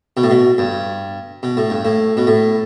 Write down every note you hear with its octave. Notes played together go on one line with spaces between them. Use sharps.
B2
A2
B2
G2
B2
A2
G2
A2
B2
A2